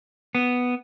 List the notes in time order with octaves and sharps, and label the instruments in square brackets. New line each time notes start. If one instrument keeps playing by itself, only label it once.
[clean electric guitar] B3